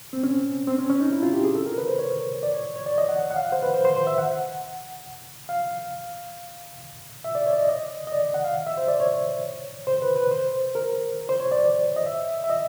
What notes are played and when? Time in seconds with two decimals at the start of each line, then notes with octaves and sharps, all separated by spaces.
0.13 C4
0.24 C#4
0.67 C4
0.78 C#4
0.90 C#4
1.00 D#4
1.12 E4
1.23 F4
1.33 G4
1.44 G#4
1.55 A4
1.66 A#4
1.78 B4
1.88 C5
1.99 C#5
2.43 D5
2.54 C#5
2.76 C#5
2.86 D5
2.98 D#5
3.09 F#5
3.19 F#5
3.31 F#5
3.36 F5
3.41 F#5
3.52 C5
3.63 B4
3.74 C5
3.85 C5
3.97 C5
4.07 E5
4.18 F#5
5.49 F5
7.24 E5
7.35 D5
7.46 C#5
7.53 D5
7.57 D#5
7.69 D#5
8.07 D#5
8.12 D5
8.34 F#5
8.44 F5
8.67 E5
8.77 C5
8.88 D5
9.00 C#5
9.87 C5
10.02 B4
10.16 B4
10.31 C5
10.75 A#4
11.29 C5
11.40 C#5
11.52 D5
11.96 D#5
12.06 E5
12.44 E5
12.50 D#5